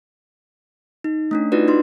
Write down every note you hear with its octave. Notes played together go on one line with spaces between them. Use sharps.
D#4
A3 C#4 D4
D4 D#4 F4 F#4 B4 D5
D4 D#4 C6